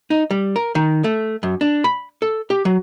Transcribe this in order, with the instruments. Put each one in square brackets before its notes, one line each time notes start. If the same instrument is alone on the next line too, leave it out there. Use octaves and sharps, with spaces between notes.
[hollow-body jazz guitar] D#4
G3
A#4
D#3
A3
F#2
D4
B5
A4
G4
F#3